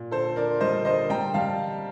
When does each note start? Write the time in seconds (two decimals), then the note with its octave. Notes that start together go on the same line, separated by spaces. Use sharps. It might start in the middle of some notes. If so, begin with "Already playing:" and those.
Already playing: A#2
0.11 D3 A4 C5
0.36 D3 A#4 D5
0.60 G3 C5 D#5
0.85 D3 C5 D#5
1.10 G3 G5 A#5
1.34 G3 F5 A5